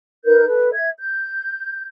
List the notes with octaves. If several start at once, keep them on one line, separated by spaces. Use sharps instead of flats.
D#4 A#4 B4 G6
A4 B4
E5 G#6
G6